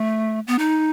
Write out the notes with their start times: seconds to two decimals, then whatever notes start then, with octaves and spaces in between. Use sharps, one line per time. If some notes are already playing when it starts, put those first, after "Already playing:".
Already playing: A3
0.47 B3
0.58 D#4